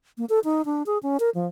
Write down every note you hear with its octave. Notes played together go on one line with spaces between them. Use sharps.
A#3
A4
D#4
D4
G#4
C#4
A#4
F3